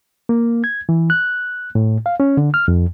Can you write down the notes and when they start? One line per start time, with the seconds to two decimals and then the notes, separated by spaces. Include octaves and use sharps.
0.29 A#3
0.64 G#6
0.89 E3
1.10 F#6
1.75 A2
2.06 F5
2.20 C#4
2.37 D3
2.54 F6
2.68 F2